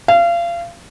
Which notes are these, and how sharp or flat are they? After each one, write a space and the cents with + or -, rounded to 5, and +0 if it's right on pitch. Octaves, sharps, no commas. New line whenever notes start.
F5 -30